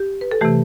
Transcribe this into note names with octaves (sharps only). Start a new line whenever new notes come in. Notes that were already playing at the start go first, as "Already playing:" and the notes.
Already playing: G4
B4
A4
C3 E3 A3 G4